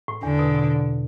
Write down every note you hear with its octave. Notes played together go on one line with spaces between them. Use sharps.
A2
E2 D3
B2
B2